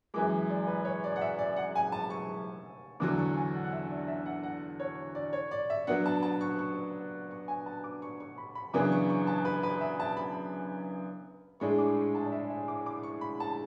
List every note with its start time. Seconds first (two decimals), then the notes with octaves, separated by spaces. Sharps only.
0.14 F#2 E3 G#3 D6
0.49 D5
0.67 B4
0.85 C#5
1.04 D5
1.16 F#5
1.21 E5
1.39 D5
1.56 F#5
1.76 G#5
1.92 A5
2.10 C#6
3.00 E2 D3 F#3 D6
3.18 C#6
3.37 G#5
3.54 F#5
3.64 F#5
3.73 E5
3.90 D5
4.08 E5
4.26 F#5
4.43 F#5
4.80 C#5
5.15 D5
5.33 C#5
5.51 D5
5.70 E5
5.87 F#3 B3 D4 F#5
6.06 A5
6.23 A5
6.41 C#6
6.59 C#6
7.31 C#6
7.48 G#5
7.66 A5
7.84 D6
8.02 C#6
8.20 C#6
8.38 B5
8.55 B5
8.74 F#2 C#3 E3 B3 D4 D6
8.92 C#6
9.10 C#6
9.27 A5
9.45 B4
9.63 B4
9.81 E5
10.00 A5
10.17 B5
11.60 A2 G#3 D4 G#4 C#6
11.78 D6
11.97 C#6
12.15 A5
12.25 D5
12.32 E5
12.50 E5
12.68 D6
12.86 D6
13.03 C#6
13.21 B5
13.40 A5